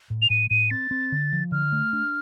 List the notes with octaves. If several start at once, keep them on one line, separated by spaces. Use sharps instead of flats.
A2
F7
A2 D#7
A2 D#7
C4 A6
C4
D3
F3
D3 F6
A3
D4